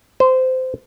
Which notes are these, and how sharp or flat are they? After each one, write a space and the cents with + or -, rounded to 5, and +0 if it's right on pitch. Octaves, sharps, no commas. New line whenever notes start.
C5 -20